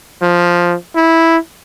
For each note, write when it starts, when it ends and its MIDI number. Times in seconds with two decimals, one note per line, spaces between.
0.22 0.75 53
0.96 1.37 64